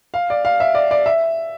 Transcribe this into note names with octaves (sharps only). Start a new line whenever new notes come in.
F5
D5
F5
E5
D5
D5
E5